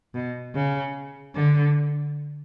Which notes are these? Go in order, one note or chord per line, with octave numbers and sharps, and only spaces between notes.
B2
C#3
D3